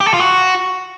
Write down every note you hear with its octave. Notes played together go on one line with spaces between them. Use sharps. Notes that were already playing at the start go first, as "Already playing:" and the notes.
G4
A4
F4
F#4